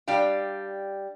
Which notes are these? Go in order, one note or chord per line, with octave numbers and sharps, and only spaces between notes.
G3 D4 F5 G5